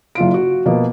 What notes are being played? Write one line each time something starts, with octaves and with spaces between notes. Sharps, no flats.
F#1 F4 D7
F#4
B2 F3 A#3